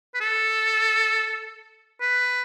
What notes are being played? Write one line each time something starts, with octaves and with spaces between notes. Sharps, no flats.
B4
A4
B4